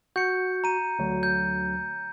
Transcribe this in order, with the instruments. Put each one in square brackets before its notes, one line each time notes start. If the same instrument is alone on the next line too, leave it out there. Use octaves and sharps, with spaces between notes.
[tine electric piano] F#4 [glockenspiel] G6 C#7
[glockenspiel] A#5 D#7
[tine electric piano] D2 F#3
[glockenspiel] G6